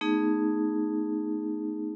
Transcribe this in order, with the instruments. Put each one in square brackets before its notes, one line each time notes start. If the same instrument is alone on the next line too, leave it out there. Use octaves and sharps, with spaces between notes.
[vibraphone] A3 B3 D#4 G#4